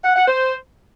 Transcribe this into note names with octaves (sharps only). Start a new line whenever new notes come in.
F#5
F#5
C5